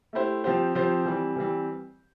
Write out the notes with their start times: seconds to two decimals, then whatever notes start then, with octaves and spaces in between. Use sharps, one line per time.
0.13 A3 E4 G4 C5
0.44 F3 C4 G4 C5
0.75 F3 C4 G4 C5
1.05 E3 G3 C4
1.36 E3 G3 C4